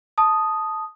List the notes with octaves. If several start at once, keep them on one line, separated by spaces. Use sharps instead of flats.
A5 D#6